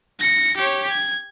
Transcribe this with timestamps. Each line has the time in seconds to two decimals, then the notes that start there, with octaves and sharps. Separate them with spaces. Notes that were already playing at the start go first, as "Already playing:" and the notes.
0.19 A#6 C#7
0.57 G4 C#5
0.89 G#6